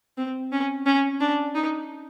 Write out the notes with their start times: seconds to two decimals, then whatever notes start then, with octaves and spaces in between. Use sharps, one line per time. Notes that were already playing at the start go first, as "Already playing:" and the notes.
0.17 C4
0.52 C#4
0.86 C#4
1.21 D4
1.55 D#4